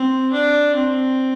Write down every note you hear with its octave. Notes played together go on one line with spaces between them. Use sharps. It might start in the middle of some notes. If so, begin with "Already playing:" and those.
Already playing: C4
D4
C4